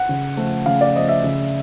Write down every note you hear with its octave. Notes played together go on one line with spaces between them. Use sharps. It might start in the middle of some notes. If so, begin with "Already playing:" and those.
Already playing: F#5
C#3
F3 A3
C#3 F5
D5
F3 A3 D#5
E5
C#3